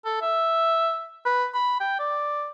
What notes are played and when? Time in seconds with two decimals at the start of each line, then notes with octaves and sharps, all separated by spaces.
0.05 A4
0.22 E5
1.26 B4
1.54 B5
1.81 G5
2.00 D5